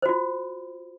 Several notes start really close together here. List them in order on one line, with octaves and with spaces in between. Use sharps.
C5 F#4 F4